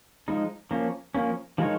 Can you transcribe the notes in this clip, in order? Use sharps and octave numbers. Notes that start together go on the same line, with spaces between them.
F3 G#3 D#4
F3 A#3 C#4
F3 A#3 C#4
F3 G#3 D#4 A#4 C#5